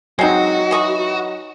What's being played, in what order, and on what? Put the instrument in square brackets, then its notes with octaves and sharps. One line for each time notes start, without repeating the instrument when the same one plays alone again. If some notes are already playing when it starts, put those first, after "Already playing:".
[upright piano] F#3 D#4 [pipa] G#3 C4 [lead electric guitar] F#4
[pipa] E3 D#5 C#6